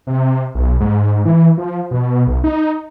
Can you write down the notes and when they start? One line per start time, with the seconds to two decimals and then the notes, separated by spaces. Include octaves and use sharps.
0.07 C3
0.55 B1
0.80 G#2
1.25 E3
1.58 F3
1.91 B2
2.27 B1
2.44 D#4